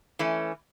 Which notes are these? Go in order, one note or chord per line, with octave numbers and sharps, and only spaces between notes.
E3 A3 C#4